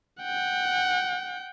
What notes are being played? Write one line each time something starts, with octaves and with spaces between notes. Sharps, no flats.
F#5 G5